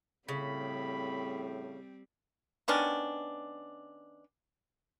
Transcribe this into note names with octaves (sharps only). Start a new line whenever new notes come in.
A2 C#3 G3 C4 B5
D#3 B3 C#4 D4